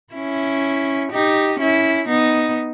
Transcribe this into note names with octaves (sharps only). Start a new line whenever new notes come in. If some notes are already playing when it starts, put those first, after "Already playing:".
C#4 E4
D#4 G4
C#4 E4
B3 D#4